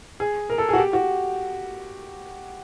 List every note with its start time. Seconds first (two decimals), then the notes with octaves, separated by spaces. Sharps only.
0.20 G#4
0.50 A#4
0.58 A4
0.69 G#4
0.73 F#4
0.78 G4
0.93 F#4